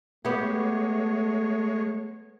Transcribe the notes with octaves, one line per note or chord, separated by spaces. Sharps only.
G#3 A3 B3 G4 C#5